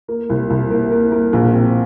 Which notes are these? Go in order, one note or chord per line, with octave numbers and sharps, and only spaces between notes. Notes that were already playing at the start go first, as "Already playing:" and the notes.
A#3
C2
C2
A#3
A#3
A#3
A#1
C4